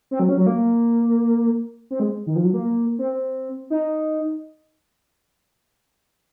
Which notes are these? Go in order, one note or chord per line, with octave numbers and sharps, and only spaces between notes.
C4
F#3
C#4
F#3
A#3
C4
G#3
D#3
F3
F#3
A#3
C4
D#4